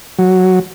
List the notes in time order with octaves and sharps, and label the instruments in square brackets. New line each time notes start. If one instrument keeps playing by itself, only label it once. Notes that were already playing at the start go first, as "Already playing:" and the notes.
[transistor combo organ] F#3